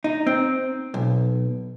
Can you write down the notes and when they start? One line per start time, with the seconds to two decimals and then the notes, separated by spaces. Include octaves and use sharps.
0.04 D#4
0.27 C4
0.94 B1